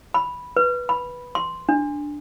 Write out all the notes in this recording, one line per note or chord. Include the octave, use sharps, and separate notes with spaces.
B5
B4
B5
C6
D4